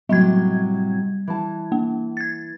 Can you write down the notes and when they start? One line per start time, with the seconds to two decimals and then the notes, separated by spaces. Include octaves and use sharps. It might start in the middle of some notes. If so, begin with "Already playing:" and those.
0.09 A2 C3 F#3 G3 G#6
1.27 E3 A5
1.72 A#3
2.17 G#6 A6